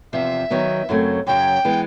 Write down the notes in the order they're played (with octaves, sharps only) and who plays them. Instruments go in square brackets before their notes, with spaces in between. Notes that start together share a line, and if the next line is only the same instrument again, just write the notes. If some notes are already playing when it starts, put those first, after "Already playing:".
[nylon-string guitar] E2 C3 F3 [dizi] E5
[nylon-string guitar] D#3 F#3 B3
F#2 C#3 F#3 A3 C4
[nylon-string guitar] F#2 C#3 F#3 [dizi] G5
[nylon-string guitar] E3 G#3 B3